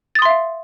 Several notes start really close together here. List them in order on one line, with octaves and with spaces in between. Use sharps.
A6 D#6 C6 E5 F5